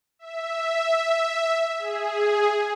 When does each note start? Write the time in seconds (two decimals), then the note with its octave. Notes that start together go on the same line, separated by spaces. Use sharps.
0.19 E5
1.79 G#4